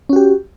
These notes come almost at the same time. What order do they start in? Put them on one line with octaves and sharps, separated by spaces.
C#4 F#4 G4